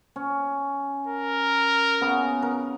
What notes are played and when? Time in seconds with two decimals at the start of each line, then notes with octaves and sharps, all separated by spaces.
0.16 C#4
1.07 A#4
2.01 C#3 B3
2.42 A#4